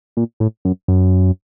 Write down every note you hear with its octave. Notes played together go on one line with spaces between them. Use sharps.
A#2
A2
F#2
F#2